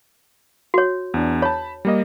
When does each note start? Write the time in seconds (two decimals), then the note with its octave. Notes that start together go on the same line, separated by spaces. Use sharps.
0.74 F#4 C#5
1.14 E2 D4
1.42 C#5 A5 B5
1.85 G3 A#3 D#5